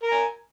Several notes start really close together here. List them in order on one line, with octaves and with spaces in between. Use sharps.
A#4 A#5 G#5